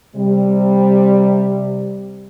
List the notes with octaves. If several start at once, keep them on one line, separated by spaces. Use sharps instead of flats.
C3 G3